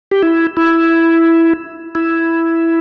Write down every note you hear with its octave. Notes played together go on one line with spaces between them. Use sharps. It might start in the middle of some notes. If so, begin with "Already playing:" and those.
G4
E4
E4
E4